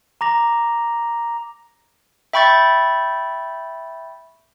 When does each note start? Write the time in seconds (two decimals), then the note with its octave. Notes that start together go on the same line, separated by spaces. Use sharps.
0.21 A#5 D6 A#6 F7
2.33 E5 G5 B5 C#6 G6 A6